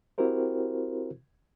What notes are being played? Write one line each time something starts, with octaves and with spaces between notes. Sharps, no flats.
C4 E4 F#4 G4 A#4 C5